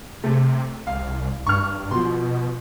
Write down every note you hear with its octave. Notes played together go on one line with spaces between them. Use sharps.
C3 A3
C2 F5
G2 C#6 F6
B2 F3 C6